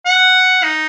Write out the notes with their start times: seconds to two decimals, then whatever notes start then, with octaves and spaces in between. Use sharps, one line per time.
0.06 F#5
0.63 D#4